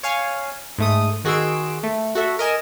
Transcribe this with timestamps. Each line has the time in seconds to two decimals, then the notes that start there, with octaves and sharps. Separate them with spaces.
0.03 C#5 F5 G#5
0.78 G#2 A3 D#6
1.24 D#3 F#4 G#4 C6 E6 D7
1.83 A3
2.15 F#4 A4 E5
2.39 A#4 D#5 G#5 E7